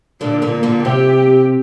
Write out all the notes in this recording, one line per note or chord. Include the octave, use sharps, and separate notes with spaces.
A#2 D3 D4
A#2 D3
A#3
A#2 D3
C3 G4